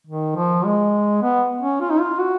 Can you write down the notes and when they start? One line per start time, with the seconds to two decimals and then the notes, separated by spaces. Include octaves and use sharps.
0.07 D#3
0.36 F3
0.65 G#3
1.22 B3
1.61 C#4
1.81 F4
1.90 D#4
2.00 F4
2.19 F#4